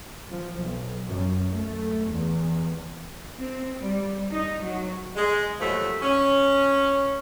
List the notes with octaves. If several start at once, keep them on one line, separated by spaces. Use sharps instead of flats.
F3
B1
F#2
A3
E2
C4
G3
D#4
F#3
G#3
D#2 F3 F#3 A3
C#4